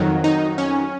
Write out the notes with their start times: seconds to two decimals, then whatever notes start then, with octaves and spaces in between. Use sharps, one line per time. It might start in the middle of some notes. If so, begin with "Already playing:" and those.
Already playing: F2 D#3 F#3
0.24 D#4
0.58 C#4